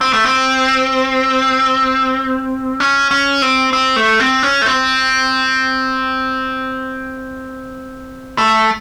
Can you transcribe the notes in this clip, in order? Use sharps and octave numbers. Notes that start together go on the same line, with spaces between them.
C4
A3
C4
C#4
C#4
C4
C4
A3
C4
C#4
A3
C4
A3